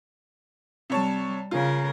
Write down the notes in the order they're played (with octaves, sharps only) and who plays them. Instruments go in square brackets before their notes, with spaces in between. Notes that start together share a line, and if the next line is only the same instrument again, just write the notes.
[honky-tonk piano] C3 C#5 A5 [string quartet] G3
[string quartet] C#3 A#4 [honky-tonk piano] F4